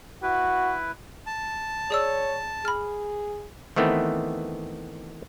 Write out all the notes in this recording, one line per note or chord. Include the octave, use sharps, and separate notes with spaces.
E4 F#4 B4
A5
G#4 C#5 D5 E6
G#4 B5 F6
D#3 E3 A3 B3 C4